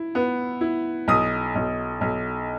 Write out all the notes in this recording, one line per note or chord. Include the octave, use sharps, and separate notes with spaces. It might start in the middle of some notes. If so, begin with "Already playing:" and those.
Already playing: E4
B3
E4
B1 D#6
B1
B1